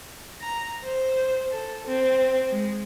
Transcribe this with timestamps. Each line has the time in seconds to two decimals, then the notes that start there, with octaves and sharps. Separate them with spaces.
0.40 A#5
0.83 C5
1.49 A4
1.86 C4
2.51 G#3